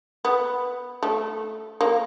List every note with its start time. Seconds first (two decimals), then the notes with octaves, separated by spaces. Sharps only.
0.25 B3
1.03 A3
1.81 A#3